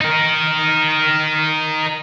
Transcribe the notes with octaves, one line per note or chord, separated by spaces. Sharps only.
D#4 A#4